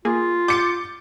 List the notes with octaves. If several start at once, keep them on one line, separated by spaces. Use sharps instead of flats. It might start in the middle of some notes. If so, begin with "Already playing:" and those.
A#3 F4 G#4
D6 G6 A6 C#7